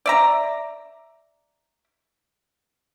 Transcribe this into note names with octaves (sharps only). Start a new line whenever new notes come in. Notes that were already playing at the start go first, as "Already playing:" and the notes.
D5 E5 A#5